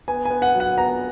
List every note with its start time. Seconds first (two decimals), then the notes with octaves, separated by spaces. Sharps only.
0.08 B3 G#5
0.25 G#5
0.30 B3
0.42 F#5
0.54 F#3
0.60 F#5
0.78 B3 A#5